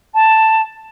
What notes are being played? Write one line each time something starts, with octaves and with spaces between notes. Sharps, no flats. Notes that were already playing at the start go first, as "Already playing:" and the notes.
A5